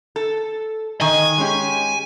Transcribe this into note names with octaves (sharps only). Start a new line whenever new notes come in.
A4
D#3 D#5 G#5
G#3 C#4 G4